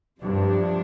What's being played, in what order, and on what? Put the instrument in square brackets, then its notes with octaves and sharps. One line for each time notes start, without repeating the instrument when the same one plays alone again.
[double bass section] G2 [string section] C3 F3 D4